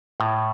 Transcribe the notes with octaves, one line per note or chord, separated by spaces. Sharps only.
A2